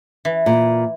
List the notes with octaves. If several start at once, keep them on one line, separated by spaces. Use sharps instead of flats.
E3
A#2